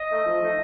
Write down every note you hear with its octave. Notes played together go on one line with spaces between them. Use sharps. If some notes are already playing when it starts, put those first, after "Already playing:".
Already playing: D#5
A3 D#4
F3
A3 D#4